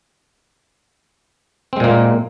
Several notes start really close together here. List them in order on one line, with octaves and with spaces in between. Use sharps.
C4 G#3 A#2 A#3